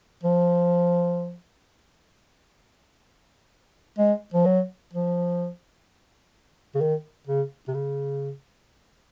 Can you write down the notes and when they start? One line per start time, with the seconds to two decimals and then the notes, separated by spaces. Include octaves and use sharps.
0.23 F3
3.98 G#3
4.34 F3
4.46 F#3
4.93 F3
6.74 C#3
6.81 D#3
7.27 C#3
7.68 C3
7.74 C#3